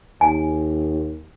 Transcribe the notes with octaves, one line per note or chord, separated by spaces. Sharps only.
D#2 G#5